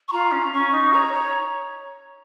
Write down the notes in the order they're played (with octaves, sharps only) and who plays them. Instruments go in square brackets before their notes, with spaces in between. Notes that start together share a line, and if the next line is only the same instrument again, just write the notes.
[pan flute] C#6
[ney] F4 [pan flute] A#5
[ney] C#4
[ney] C#4 [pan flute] C#6
[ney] D#4
[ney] C#5 [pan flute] A#5
[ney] C#5